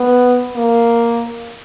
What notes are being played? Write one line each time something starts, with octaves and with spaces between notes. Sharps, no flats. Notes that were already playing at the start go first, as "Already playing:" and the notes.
Already playing: B3
A#3